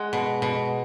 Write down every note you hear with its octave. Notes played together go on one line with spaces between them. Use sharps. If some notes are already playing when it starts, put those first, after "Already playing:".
Already playing: G#3 F#5
B2
B2